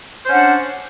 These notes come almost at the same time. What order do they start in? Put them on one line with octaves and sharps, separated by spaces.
C5 C#4 F#5 D4